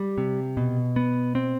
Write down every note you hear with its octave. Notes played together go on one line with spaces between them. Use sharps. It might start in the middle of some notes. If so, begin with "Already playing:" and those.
Already playing: G3
C3
B2
B3
C4